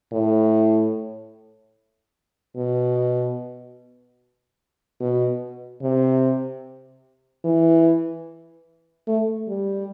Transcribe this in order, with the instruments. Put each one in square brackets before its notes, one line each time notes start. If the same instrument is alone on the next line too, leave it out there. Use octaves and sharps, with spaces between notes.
[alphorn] A2
B2
B2
C3
E3
A3
G3